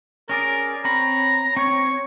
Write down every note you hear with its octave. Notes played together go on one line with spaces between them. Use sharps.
C#4 G#4 A#4 D5
C4 C#5 A#5 B5
C4 C#5 C#6